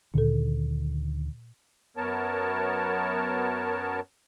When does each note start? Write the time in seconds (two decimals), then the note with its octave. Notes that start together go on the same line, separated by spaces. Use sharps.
0.14 D2 A#2 D3 D#3 A4
1.97 F#2 B3 A#4 C#5 A5